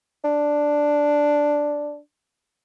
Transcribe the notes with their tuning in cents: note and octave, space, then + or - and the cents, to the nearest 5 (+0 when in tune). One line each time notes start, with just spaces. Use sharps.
D4 +0